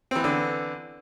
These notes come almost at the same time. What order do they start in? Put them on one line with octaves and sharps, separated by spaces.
C4 E3 B3 D3